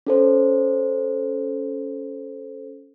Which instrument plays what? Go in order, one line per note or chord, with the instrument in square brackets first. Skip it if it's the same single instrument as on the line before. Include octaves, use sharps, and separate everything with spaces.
[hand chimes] C#4 A4 C5